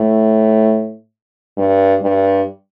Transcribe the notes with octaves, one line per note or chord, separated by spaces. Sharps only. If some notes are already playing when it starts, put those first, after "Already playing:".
Already playing: A2
G2
G2